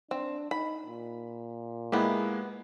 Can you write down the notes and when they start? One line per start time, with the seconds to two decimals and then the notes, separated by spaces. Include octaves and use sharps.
0.11 C4 D4
0.51 D#4 B5
0.86 A#2
1.92 G#3 A#3 B3 E4 G4